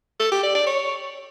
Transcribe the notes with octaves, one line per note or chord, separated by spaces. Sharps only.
A4
G4
D5
D5
C#5